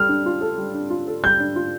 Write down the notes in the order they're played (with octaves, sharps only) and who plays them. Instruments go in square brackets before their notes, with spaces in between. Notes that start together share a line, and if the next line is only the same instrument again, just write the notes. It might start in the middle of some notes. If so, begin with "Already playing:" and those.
Already playing: [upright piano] G3 A4 [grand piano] F6
[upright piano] D4
F4
A4
G3
D4
F4
A4
[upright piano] G3 [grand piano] G6
[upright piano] D4
F4